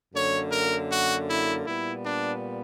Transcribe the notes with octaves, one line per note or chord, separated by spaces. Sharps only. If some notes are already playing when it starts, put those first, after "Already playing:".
F#2 D3 A#3 C#5
A#4
F#4
E4
A#2 G3 B3 E4
D4